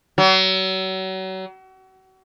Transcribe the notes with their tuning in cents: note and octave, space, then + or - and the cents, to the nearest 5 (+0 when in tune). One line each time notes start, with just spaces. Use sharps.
F#3 +35